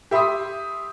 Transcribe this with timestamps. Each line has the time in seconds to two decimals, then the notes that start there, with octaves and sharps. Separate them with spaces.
0.11 G4 E5 B5 C6 D#6